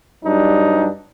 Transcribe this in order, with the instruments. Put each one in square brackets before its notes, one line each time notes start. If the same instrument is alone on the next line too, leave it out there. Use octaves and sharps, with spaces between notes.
[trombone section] G2 F#3 G3 D4 D#4